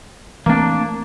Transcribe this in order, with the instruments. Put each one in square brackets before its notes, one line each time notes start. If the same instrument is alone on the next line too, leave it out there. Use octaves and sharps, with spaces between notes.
[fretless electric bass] E3 A3 C4 [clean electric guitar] A#3 D4